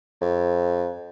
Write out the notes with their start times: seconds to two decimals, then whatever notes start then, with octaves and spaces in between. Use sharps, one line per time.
0.21 F2